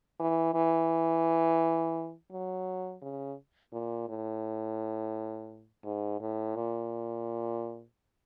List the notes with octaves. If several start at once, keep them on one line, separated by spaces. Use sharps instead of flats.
E3
E3
F#3
C#3
A#2
A2
G#2
A2
A#2